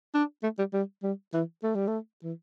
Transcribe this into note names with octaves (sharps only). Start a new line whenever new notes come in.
D4
A3
G3
G3
G3
E3
A3
G3
A3
E3